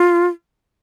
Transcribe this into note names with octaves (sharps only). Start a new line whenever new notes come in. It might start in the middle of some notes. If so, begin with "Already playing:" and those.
Already playing: F4